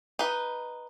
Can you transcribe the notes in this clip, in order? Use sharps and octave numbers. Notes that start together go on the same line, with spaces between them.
D#4 B4